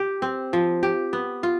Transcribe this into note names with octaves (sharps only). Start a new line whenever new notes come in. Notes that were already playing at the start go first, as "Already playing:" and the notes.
Already playing: G4
C4
F3
G4
B3
F4